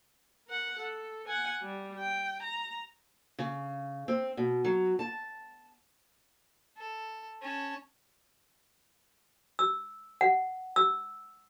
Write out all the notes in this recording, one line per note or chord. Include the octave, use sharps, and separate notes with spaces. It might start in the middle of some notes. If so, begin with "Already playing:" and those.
A#4 F#5
A4
F#5 G#5
G3
G5
A#5
C#3
C4
B2
F#3
A5
A4
C#4 A5
E6
F#5
E6